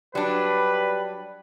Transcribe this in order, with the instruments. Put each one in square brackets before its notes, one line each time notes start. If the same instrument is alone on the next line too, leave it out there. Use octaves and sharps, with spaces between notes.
[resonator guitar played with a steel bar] F#3 D4 [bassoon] G3 [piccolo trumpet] B4